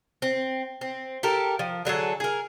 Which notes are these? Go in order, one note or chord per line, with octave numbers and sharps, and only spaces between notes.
C4
C4
G4 A4 A#4
F3
D3 F#3 G#4 A4
G#4 A#4